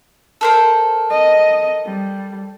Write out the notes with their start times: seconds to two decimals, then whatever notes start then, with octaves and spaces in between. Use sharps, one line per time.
0.41 A4 A#4 C5
1.10 D#5
1.85 G3